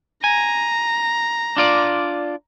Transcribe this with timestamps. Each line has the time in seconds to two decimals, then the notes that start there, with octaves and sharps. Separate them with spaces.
0.24 G#5 A#5
1.57 D4 F4 D5